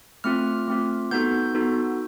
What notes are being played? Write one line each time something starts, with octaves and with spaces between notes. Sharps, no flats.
A3 C4 F4 F6
A3 C4 F4
B3 D#4 F#4 A4 G6
B3 D#4 F#4 A4